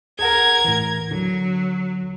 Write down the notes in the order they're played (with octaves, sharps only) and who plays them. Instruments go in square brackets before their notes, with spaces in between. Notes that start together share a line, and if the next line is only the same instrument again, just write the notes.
[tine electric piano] G#4 F#5 [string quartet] A#4 G#6
[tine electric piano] A2 E3
[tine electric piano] D3 [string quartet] F#3